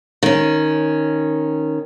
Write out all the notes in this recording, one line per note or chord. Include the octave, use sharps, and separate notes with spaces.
D#3 C#4